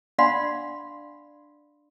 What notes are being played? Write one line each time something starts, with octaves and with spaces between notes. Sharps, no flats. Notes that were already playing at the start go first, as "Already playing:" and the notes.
D4 D5 F5 F#5 B5 C6